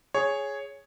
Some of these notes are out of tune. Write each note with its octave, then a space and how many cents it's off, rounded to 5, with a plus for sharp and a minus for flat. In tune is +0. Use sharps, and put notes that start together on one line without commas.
G#4 +0 C#5 +0